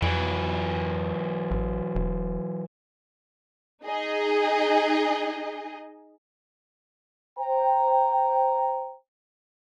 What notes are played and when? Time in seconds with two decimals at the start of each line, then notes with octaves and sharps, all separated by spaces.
0.02 F2 E3 F#3
1.51 A1
1.95 E1
3.84 D#4 G#4 D#5
7.39 C5 G5 A#5